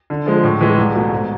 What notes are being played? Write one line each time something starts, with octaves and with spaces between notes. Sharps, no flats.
D3
F3 G#3
A2
E3 G#3
C2
B2 A3
G#2